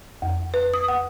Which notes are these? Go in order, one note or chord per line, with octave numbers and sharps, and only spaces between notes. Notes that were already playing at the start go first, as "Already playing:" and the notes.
F2
B4
D#6
F#5